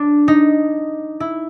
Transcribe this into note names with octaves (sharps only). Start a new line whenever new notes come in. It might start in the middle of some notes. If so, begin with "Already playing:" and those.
Already playing: D4
D#4
E4